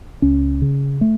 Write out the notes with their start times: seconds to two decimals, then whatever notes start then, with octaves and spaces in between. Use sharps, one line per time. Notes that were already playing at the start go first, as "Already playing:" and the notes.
0.22 C#2 C#4
0.62 C#3
1.01 A3